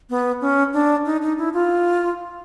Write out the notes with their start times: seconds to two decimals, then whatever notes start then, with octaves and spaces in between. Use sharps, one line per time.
0.10 B3
0.41 C#4
0.73 D4
1.06 D#4
1.22 D#4
1.38 E4
1.54 F4